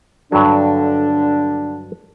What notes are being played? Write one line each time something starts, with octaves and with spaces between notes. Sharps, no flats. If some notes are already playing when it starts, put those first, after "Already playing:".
G2 D3 F#3 D4